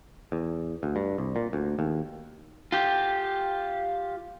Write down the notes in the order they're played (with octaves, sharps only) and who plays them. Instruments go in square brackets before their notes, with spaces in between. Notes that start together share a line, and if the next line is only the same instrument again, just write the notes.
[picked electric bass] E2
D2
G2
C2
A#2
D2
D#2
[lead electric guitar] F4 G4